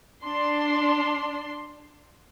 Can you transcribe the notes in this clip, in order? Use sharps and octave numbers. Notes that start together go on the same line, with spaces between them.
D4 C6